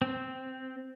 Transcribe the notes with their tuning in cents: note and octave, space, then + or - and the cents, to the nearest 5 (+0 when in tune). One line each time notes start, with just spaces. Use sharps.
C4 -5